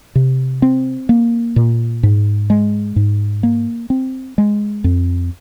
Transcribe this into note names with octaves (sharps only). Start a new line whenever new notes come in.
C3
C4
A#3
A#2
G#2
G#3
G#2
A#3
C4
G#3
F2